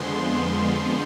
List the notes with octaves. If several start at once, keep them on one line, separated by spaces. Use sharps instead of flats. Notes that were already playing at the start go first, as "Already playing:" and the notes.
Already playing: F2 D3 F3 G#3 B3 C6
C6